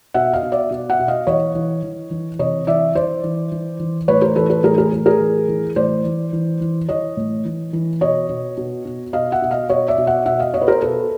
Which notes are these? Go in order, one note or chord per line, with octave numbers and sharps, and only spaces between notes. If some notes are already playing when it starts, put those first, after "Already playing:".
B2 E5 F#5
D#5 F5
B2
D5 E5
B2
E5 F#5
B2
D#5 F5
E3 C#5 D#5
E3
E3
E3
C3 C#5 D#5
E3 D5 E5
E3 C5 D5
E3
E3
E3
A2 B4 C#5
A#4 C5
E3 A4 B4
A4 B4
A2 G#4 A#4
G#4 A#4
A2
G#4 A#4
E3
E3
A2 C5 D5
E3
E3
E3
E3 C#5 D#5
A2
E3
E3
B2 C#5 D#5
B2
B2
B2
B2 D#5 F5
E5 F#5
B2
D#5 F5
B2 C#5 D#5
D5 E5
B2
E5 F#5
B2 E5 F#5
D#5 F5
B2 C#5 D#5
B4
A#4 C5
B2 A4 B4